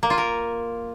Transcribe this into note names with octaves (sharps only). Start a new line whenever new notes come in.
A#3
F4
A#4